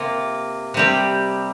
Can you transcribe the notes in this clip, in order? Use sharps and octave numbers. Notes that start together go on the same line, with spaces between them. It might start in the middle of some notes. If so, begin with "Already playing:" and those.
Already playing: C3 A#3 F4
C3 G3 C4 G4